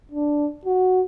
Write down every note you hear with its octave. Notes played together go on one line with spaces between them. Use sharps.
D4
F#4